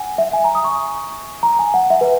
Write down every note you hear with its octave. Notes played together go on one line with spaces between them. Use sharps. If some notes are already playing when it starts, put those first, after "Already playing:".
Already playing: F#5 G#5
E5
G#5
A#5
D#6
C#6
A#5
G#5
F#5
E5
B4